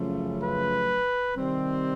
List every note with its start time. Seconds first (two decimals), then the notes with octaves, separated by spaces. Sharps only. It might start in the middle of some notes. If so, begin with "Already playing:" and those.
Already playing: F#2 C#3 F3 A3
0.43 B4
1.36 C3 D#3 G3 C4